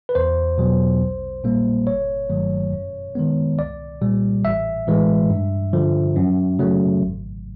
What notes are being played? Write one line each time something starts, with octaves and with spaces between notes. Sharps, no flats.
B4
E2 C5
B2 F#3 B3
A#1
A#2 G3 A#3
G1 C#5
G2 D#3 F#3 A3
F#2
D#3 G#3 B3
C2 D5
A#2 G3
A1 E5
A2 E3 G#3
G2
D3 F3
F#2
C#3 F#3 A3
G#1